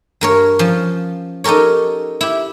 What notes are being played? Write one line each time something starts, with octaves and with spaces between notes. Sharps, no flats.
G2 A#4 C#5
F3 C#4
D#4 G4 A4 A#4 C#5
E4 G4